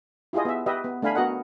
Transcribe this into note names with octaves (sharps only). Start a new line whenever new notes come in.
E4 F4 G4 G#4 D#5
B3 E5
G4 B4 D#5 E5
B3
A3 D4 F5 G#5 B5
B3 F#4 A#4 D#5 F#5